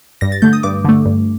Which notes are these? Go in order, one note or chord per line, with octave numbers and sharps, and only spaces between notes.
G2 A#6
A6
D3 A3 G6
D#6
G2 D6
D3 A3
G2